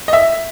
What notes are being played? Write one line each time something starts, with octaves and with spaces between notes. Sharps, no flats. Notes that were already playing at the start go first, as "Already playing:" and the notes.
D#5
E5